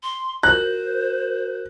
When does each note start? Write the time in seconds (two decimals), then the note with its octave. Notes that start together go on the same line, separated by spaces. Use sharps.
0.03 C6
0.43 F#4 A#4 C5 F#6